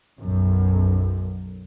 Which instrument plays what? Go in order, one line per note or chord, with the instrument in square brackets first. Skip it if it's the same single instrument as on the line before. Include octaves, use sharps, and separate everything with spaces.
[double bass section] B1 F#2